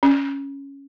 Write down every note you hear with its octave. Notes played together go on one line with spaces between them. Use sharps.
C#4